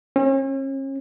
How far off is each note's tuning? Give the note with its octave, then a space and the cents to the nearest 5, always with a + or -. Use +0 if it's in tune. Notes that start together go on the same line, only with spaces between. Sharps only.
C#4 -40